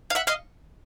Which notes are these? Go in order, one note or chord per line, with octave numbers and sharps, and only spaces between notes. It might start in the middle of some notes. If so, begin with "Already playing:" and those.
F5
E5 F#5
D#5 F5